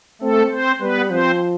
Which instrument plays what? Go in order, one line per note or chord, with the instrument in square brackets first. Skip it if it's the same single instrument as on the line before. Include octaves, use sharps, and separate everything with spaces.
[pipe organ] A3 A4 [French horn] C4
[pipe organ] C4 C5
[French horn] G3 [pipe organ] B3 B4
[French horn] F3 [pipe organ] C4 C5